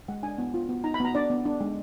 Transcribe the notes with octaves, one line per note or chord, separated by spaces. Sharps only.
G#3 F#5
D4 G#5
B3
F4
B3
D#4 A#5
B5
B3 A#5
D4 D5
B3
D4
G#3